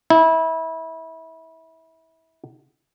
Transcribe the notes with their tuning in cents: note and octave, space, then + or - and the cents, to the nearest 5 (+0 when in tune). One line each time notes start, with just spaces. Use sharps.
E4 -25